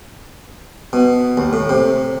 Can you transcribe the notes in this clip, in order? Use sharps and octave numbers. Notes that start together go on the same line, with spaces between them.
B2
D#2
A2
C3